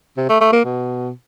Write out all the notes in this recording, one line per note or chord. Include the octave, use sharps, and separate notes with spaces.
C3
A3
A3
A#3
B2